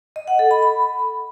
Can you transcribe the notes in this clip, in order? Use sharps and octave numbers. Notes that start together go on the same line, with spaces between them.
D#5
F#5
A4
B5
B5